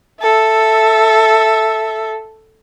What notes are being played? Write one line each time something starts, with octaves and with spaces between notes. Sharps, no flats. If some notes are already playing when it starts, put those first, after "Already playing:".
A4 E5